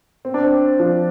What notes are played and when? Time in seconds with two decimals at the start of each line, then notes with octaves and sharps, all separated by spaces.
0.25 C4
0.34 D4
0.43 C4
0.80 F3